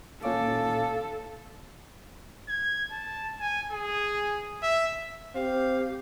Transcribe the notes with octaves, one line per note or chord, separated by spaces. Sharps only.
A#2 C#4 A4 F5 D6
G#6
A5
G#5
G#4
E5
C4 G4 F5